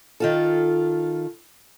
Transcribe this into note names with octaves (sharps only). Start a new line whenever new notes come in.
D#3 F4 A4